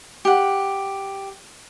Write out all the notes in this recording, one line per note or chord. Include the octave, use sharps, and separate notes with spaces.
G4 F#5